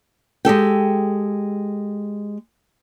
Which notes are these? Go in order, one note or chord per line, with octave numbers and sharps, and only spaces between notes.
G#3 G4 A4 G5